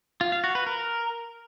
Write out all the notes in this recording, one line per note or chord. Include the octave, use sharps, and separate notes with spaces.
F4
F5
F#4
B4
A#4